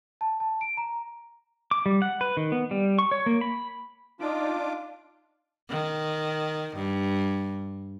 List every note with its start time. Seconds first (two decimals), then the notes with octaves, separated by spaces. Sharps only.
0.21 A5
0.40 A5
0.61 D7
0.77 A#5
1.71 D6
1.86 G3
2.02 F#5
2.21 B4
2.37 D#3
2.52 B3
2.71 G3
2.99 C#6
3.11 C#5
3.26 A#3
3.41 B5
4.20 D4 D#4 F4 D6
5.70 D#3
6.76 G2